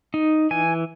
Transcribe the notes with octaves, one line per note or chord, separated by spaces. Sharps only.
D#4
E3 G#5